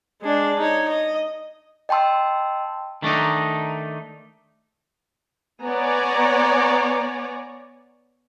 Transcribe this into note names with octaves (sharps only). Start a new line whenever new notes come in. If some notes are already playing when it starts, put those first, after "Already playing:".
G#3 D4
D#4 C#5
D#5
D#5 G5 A5 C6 E6
D#3 A3 D4 D#4
B3 C#5 D5 G#5 A#5